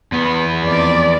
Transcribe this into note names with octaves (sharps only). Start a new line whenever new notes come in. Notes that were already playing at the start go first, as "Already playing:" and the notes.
E2 B3
F2 D5